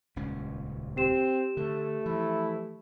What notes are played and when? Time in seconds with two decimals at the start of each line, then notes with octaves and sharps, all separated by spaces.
0.16 D#1 C#2 C#4
0.97 C4 G4 E7
1.57 D3 A3
2.06 E3 F3 E4